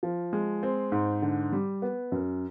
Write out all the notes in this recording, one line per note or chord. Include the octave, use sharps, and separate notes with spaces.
F3
G#3
C4
G#2
D3
G3
B3
F#2